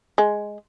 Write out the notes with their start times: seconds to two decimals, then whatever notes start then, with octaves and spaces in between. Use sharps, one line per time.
0.18 G#3